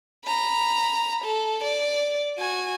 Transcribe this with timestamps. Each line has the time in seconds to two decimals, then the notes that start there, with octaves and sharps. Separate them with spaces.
0.25 A#5 B5
1.24 A4
1.64 D5
2.38 F#4 G#5